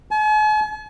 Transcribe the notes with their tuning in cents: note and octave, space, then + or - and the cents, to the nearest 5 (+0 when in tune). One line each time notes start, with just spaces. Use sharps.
G#5 +45